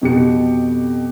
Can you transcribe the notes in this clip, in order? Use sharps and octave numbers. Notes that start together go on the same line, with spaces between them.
F2 B2 G4 C#7